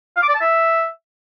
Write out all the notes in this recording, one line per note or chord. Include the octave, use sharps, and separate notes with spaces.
F5
D6
D5
A5
E5